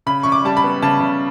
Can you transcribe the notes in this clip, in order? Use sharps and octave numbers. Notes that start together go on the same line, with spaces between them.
C#3 B5
C#3 C#6
D6
G3 A5
B5
B3
C#3 A5
C#3